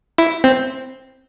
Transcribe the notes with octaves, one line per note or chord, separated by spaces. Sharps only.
E4
C4